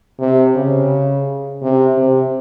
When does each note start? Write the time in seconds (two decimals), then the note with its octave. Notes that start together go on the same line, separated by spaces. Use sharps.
0.20 C3
0.56 C#3
1.62 C3
1.97 C3